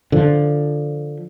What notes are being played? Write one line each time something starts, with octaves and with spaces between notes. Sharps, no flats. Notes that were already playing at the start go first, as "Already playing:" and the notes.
D3 F3